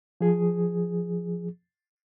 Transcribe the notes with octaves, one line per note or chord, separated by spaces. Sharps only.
F3 G#4